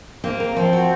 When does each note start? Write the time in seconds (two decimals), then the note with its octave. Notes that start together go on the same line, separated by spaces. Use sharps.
0.24 A#3 C4
0.40 A#4
0.56 F3 C4
0.73 F#4